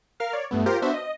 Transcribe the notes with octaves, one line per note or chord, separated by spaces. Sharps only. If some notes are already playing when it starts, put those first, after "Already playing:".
A#4 F5 F6
C#5 D5
G2 A3 B3
F4 G4 A#4 C5
B3 D4 F#4 C5 E5
D#5